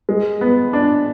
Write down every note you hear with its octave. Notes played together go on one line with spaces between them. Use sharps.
G#3
B3
D4